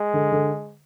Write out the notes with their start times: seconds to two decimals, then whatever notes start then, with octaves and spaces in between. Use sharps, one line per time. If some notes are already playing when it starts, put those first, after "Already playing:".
Already playing: G#3
0.14 D3
0.32 D3